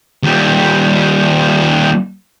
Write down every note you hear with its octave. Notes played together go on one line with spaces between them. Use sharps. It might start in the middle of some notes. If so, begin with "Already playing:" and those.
D#2 G3